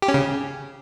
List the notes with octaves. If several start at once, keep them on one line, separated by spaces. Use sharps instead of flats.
G4
C#4
C#3